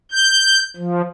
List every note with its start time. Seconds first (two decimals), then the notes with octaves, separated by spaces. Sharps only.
0.11 G6
0.77 F3